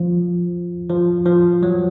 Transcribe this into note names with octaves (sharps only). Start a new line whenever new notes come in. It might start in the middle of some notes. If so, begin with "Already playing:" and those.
Already playing: F3
F3
F3
F#3